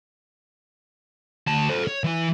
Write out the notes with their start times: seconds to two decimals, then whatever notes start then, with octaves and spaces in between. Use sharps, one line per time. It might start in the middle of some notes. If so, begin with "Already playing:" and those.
1.47 D2 A5
1.69 A4 C5
1.87 C#5
2.04 E3 E4